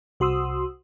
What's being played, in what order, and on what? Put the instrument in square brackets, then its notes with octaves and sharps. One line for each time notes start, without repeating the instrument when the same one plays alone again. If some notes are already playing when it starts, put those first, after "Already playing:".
[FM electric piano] C2 F#4 C6 D#6 E6